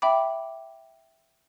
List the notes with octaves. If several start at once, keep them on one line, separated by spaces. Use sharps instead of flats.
E5 G5 B5 D6